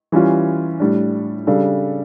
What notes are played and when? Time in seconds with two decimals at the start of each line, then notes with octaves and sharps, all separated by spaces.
0.12 E3 G3 C#4 F4
0.80 A2 G3 D4
1.47 C#3 G3 D4 A4